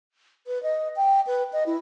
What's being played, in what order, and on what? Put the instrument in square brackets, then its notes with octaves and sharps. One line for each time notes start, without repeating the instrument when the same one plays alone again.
[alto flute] B4
D#5
G5
B4
D#5
E4